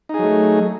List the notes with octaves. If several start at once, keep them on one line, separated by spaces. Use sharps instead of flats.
F#3 A3 D#4 G#4